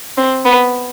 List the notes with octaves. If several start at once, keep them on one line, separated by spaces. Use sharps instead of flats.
C4
B3